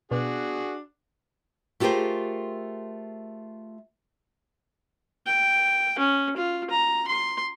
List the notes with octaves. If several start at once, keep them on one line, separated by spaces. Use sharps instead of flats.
B2 D4 F#4 G#4
A3 F4 G4 G#4 A#4 C5
G5
C#4
F4
A#5
C6